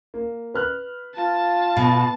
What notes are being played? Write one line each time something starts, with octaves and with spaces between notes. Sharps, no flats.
A#3
B4 F6 F#6
F4 A5
B2